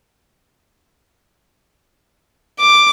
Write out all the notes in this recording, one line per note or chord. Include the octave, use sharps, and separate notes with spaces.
D6